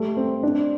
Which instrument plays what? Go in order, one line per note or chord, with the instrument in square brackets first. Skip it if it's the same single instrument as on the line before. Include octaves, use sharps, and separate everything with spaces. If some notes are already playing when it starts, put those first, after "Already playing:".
Already playing: [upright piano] G3 A3
C4
D4